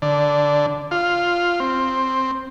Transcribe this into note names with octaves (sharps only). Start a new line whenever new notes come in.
D3
F4
C4